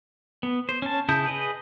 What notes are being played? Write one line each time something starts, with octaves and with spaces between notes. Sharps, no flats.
B3
C5
C#4 A5
C#3 E4 A5 D#6 G6
G#4 B4 D#5